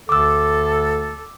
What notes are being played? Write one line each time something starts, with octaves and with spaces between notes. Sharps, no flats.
D2 D3 A4 D6 E6